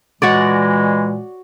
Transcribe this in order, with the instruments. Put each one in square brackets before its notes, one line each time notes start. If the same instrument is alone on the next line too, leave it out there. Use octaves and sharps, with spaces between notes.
[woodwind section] A#2 E3 G#3 [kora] F#4 C#5 D5